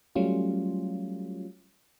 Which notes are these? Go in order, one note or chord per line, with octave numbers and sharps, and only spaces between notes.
F#3 G3 A3 C#4 F4